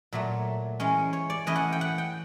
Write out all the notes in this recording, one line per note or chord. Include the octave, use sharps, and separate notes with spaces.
A#2 F#3 A3
E3 G#3 C#4
C#5
D5
E3 A3 C#4 E4 D#5
F#5
G5
F#5
G5